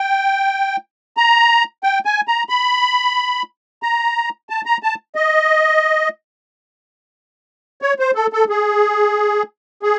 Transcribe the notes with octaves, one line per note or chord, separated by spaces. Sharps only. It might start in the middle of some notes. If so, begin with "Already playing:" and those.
Already playing: G5
A#5
G5
G#5
A#5
B5
A#5
A5
A#5
A5
D#5
C#5
C5
A4
A4
G#4
G#4